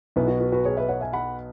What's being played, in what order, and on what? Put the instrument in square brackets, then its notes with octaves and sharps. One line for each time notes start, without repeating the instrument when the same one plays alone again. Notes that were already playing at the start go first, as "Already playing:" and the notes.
[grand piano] B1 B2 B3 [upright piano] E4
[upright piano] F#4
F#4 B4
F#4 B4
G#4 C#5
B4 E5
C#5 F#5
E5 G#5
F#5 B5